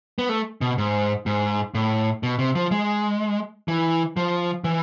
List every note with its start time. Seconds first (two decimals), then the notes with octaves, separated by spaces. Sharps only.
0.19 B3
0.29 A3
0.61 B2
0.78 G#2
1.26 G#2
1.75 A2
2.23 B2
2.39 C3
2.55 F3
2.71 G#3
3.68 E3
4.17 F3
4.64 E3